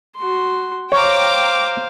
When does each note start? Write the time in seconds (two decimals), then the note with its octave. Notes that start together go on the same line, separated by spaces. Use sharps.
0.17 F#4 C6
0.92 C5 C#5 F5 G5 A#5 D6